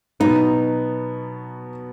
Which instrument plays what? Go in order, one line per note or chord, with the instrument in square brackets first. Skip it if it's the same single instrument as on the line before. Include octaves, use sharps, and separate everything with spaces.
[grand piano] B2 F#3 B3 [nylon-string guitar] D#4